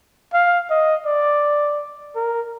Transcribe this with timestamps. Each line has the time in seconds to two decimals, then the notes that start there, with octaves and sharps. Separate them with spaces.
0.33 F5
0.70 D#5
1.06 D5
2.16 A#4